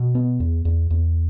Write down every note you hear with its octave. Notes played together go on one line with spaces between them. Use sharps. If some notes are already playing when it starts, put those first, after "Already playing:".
Already playing: B2
B3
E2
E2
E2